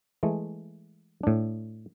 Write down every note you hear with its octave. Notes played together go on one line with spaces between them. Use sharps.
E3 G#3 A3
A2 D4